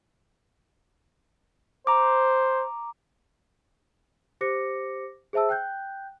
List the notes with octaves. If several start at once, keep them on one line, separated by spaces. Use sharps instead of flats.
C5 A#5 D6
G4 C5 D6 A#6 C#7
G#4 C5 E5 A5 E6
G5 F#6 G6